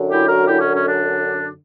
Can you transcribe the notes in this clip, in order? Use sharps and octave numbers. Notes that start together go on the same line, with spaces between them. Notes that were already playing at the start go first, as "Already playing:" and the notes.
Already playing: F#2 D3
E4 G4
F#4 A#4
E4 G4
C#4
C#4
D4